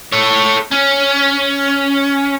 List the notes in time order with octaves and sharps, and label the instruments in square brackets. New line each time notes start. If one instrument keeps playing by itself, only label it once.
[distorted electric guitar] A4 C#5
C#4